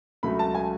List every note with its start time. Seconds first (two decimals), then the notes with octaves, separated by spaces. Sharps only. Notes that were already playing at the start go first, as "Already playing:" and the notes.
0.23 C#2 C#3 F#3 A3 B5
0.39 A5
0.55 G#5